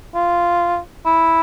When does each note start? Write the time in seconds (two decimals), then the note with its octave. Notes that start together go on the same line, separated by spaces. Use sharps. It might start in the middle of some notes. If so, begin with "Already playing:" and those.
0.15 F4
1.06 E4